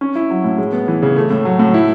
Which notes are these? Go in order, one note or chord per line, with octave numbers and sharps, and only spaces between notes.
C#4
E4
F#3
A2
G#3
B3
E3
C#3
A3
A2
F#3
A2
E4